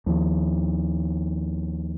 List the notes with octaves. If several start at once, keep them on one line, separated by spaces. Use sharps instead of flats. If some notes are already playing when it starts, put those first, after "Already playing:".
D#2 F3